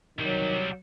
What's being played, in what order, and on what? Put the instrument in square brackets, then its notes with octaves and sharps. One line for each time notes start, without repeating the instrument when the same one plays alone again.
[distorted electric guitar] C2 G3 [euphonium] D#3 [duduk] F#3